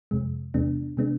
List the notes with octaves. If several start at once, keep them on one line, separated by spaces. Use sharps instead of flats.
F2 C3 G#3
E2 C3 G#3 B3 D4
C3 G#3 B3 D4